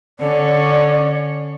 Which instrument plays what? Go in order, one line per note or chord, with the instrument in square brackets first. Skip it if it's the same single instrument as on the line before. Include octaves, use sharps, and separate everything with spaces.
[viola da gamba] D3 C#4 C#5 [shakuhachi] D5